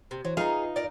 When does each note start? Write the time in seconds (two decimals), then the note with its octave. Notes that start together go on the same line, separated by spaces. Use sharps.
0.11 C3
0.25 E3 F#3 C5
0.37 D#4 F4 G#4 B4 D#5 F5 A#5
0.76 A#4 D5